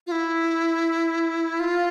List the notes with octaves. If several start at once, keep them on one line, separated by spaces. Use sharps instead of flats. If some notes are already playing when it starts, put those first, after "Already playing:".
F4
E4
F4